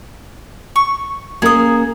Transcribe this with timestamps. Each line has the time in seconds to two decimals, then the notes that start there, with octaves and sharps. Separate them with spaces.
0.76 C#6
1.42 A#3 C#4 G#4 A#4 D#6